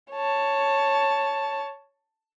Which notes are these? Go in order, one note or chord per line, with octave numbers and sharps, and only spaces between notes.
C#5 A5